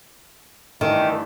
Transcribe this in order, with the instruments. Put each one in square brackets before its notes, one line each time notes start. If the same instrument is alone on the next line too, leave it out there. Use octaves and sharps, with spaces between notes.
[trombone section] G2 E3 A3 [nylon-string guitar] D#3